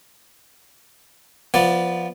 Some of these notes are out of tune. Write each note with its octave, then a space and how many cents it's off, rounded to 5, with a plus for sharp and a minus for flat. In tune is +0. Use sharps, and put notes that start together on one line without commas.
F3 +0 B3 -15 D5 +0